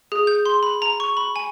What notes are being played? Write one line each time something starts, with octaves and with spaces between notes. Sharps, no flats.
G#4
G6
C6
B5
A#5
C#6
B5
G#5